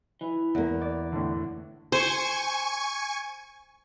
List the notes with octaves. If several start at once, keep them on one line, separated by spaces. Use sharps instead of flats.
E3
E2 A#3
D5
A2 D3
C5 G#5 C#6